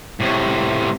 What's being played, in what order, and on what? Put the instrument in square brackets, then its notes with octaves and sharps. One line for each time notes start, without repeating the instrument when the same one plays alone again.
[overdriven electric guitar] A2 C3